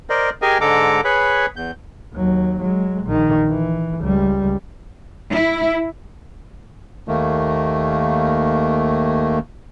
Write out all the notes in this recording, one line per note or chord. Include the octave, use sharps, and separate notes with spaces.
A#4 C5 D5 D#5
G4 G#4 A#4 D#5 G#5
G#2 D3 G#3 A4 A#5 D6
G#4 B4 C#5 B5
E2 G6
D#2 F#3
F#3 G#3
A#1 D#3
E3
C#2 G3
E4
D#2 D#3 A3 A#3